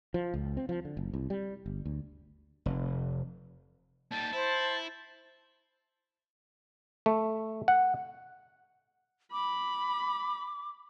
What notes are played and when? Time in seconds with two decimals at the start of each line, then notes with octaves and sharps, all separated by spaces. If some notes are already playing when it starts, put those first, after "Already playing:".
0.14 F3
0.34 C#2
0.57 C4
0.69 F3
0.85 D3
0.97 F#1
1.14 C2
1.30 G3
1.66 G1
1.85 D2
2.66 F1
4.11 D#2 G3 A5
4.33 E4 C5
7.06 A3
7.68 F#5
9.32 B5 D6